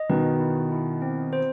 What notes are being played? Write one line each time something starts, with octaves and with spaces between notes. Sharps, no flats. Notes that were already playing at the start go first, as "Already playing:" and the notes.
Already playing: D#5
B2 D#3 B4
E4
E4
C4
C5